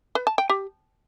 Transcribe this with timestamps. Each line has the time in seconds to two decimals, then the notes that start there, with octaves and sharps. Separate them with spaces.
0.15 B4
0.27 A5
0.38 G5
0.50 G4